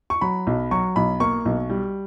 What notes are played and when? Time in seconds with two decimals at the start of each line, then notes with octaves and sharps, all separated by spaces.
0.10 C#6
0.21 F#3 B5
0.47 B1
0.71 F#3 C#6
0.96 B1 B5
1.20 A#3 C#6
1.45 B1
1.70 G3